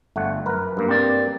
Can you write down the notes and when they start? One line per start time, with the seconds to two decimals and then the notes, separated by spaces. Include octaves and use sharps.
0.16 G1 A3 F#5
0.46 F#2 A#4 B4
0.77 G2 A#3
0.89 C4 D5